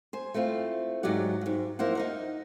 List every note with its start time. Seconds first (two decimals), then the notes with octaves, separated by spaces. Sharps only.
0.13 C5 G#5
0.34 A3 C4 E4 F4
1.03 G#2 F#3 G4 D5 F#5
1.41 F2 G#2
1.79 F3 A#3 E4 C5 F#5
1.95 D#4 A#4 F#5